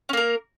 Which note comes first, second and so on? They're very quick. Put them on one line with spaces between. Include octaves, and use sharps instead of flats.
C#4 A#3 A#4